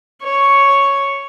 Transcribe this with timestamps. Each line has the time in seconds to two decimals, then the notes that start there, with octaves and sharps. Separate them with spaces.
0.23 C#5